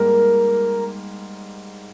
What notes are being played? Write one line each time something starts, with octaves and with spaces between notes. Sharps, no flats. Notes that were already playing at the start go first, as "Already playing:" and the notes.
Already playing: G#2 G3 A#3 A#4